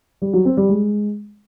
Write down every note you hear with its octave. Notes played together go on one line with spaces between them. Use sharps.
G3
F#3
C4
G3
G#3